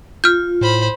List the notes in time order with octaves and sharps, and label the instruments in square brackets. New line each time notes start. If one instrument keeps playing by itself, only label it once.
[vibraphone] F4 [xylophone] F6 G6
[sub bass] A2 [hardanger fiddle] C5 B5